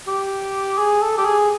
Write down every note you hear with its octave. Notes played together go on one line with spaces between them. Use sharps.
G4
G#4
A4
G4
G#4